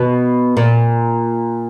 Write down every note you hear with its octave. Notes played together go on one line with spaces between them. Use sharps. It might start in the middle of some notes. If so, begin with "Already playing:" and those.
Already playing: B2
A#2